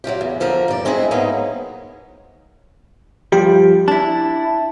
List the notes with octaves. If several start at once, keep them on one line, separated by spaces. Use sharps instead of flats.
F#3 G#3 F4 G4
E2
D3 F3 A#3 A#4
G2 D5
G#3 C4 D#4 E4 G#4
G#2 F#3 A#3 B3 D#4
G2 F3 G3 G4
D4 E4 A5